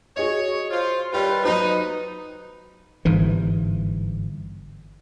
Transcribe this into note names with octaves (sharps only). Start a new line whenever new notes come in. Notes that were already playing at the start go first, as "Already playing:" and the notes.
F#4 G#4 C#5 D#5
F4 C5
D#3 G3 F4 G4 B4 C#5 G5
F#3 D#4 F#4 C5
G1 G#2 E3